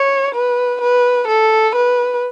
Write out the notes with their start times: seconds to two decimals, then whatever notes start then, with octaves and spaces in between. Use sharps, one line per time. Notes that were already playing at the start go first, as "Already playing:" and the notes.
Already playing: C#5
0.34 B4
0.81 B4
1.28 A4
1.75 B4